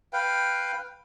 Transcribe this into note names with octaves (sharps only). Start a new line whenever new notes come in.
B4 F5 G5